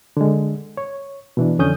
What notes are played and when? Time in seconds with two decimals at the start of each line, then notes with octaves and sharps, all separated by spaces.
0.17 D3 G#3
0.77 C#5
1.37 B2 E3 D4
1.59 F2 D3 C#4 D#6 G6